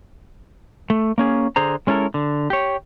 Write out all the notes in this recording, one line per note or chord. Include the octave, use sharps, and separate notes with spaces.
A3
A#3 C#4 G#4
D3 G#4 C5 A#5
G#3 C#4 E4 A4 A#4
D3
G4 C#5